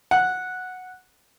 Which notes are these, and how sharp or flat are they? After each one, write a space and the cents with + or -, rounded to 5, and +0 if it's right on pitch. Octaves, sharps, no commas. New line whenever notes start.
F#5 -5